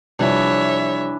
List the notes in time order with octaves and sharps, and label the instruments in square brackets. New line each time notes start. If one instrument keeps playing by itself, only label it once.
[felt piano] C3 F3 G3 [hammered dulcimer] E3 D4 [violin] C#5 E5